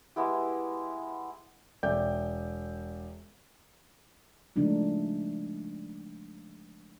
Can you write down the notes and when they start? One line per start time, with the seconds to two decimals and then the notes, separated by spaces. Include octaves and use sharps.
0.16 G#3 B3 E4 G4
1.83 E1 D5 E5 G5 G6
4.56 C#3 F3 G#3 A3 D4 D#4